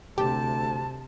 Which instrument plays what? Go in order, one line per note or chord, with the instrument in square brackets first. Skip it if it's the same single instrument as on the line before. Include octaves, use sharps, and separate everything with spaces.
[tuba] D2 [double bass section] C3 [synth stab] G4 [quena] A5